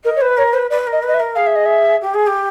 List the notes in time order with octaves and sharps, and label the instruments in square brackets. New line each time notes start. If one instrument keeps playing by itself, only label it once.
[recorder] A#4 [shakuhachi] D#5
[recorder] C#5
[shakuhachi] B4 [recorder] C5
[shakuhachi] A#4 [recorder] C#5
[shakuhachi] B4 [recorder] C5
[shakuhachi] B4 [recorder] D5
[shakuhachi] A#4
[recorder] D#5
[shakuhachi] B4
[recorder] D#5
E5
[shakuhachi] A#4
[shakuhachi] G#4 [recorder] F5
[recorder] E5
D#5
E5
[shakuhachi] G4
G#4
G4